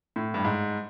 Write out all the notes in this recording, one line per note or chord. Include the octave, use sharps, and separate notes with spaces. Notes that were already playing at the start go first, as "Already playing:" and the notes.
A2
G2
G#2